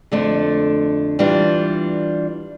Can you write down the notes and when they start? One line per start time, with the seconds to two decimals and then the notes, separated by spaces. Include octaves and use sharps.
0.12 F2 D3 A3 D4
1.19 E3 G3 D4 F4